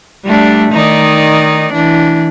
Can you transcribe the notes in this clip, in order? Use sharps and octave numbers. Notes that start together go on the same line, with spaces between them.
G3 A3 D4
D#3 D#4 D5
E3 D4